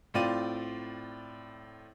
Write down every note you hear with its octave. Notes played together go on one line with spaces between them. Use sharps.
A2 C4 F4 D5 D#7